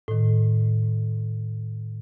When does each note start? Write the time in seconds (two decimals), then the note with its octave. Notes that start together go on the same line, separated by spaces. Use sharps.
0.08 A2 D#3